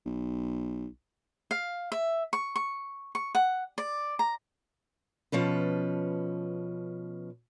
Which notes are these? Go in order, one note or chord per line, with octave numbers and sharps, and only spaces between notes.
B1
F5
E5
C#6
C#6
C#6
F#5
D5
A#5
B2 F3 C#4 B4